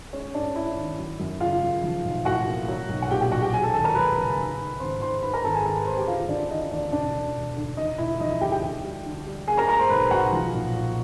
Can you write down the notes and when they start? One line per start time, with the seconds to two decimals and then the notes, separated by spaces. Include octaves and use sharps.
0.13 G#3 C#4 C#5
0.34 G2 D4 D5
0.55 G#3 E4 E5
0.77 D#3
0.99 F#3
1.19 F#2
1.40 C#3 F4 F5
1.62 F#2
1.83 F3
2.04 B1
2.25 A2 F#4 F#5
2.47 A#3
2.68 F#3
2.89 B1
3.02 F#5
3.11 A#2 G4 G5
3.21 G4 G5
3.31 B1 F#4 F#5
3.42 G4 G5
3.53 F#3 G#4 G#5
3.63 A4 A5
3.74 D#2 A4 A5
3.84 A#4 A#5
3.95 F#3 B4 B5
4.17 C#3
4.38 G#2
4.59 G#2
4.80 G#1 C5 C6
5.01 D#3 C5 C6
5.22 G#2 B4 B5
5.33 A#4 A#5
5.44 G#1 A4 A5
5.55 G#4 G#5
5.65 G#1 A4 A5
5.76 B4 B5
5.86 G#3 C5 C6
5.97 G4 G5
6.07 D2 F4 F5
6.29 D2 D4 D5
6.40 D5
6.50 E3 D#4 D#5
6.71 D2 D4 D5
6.92 E1 D4 D5
7.14 D3
7.35 E1
7.56 D3
7.77 E1 D#4 D#5
7.98 E1 E4 E5
8.20 F3 D#4 D#5
8.30 E4 E5
8.41 D2 G4 G5
8.51 G4 G5
8.62 D2
8.83 G3
9.05 D3
9.26 G3
9.47 A#3 G#4 G#5
9.57 A#4 A#5
9.68 A#3 A#4 A#5
9.79 C5 C6
9.90 B1 B4 B5
10.11 B1 F#4 F#5
10.32 F3
10.54 A#2
10.75 A#2